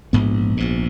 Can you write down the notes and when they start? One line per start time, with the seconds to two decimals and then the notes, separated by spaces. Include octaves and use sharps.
0.13 A#1 G#2 B3
0.57 A#1 G#2